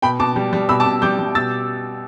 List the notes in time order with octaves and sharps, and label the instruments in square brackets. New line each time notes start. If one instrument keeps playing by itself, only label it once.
[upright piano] B2 G5 B5
B2 A5 D6
G3
G3
B2 B5 E6
A5 D6
B2
G3 D6 G6
G3
B2 E6 A6